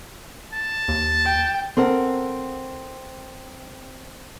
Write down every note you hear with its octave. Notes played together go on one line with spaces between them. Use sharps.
A5
D#2
G5
C4 A4 A#4 F#5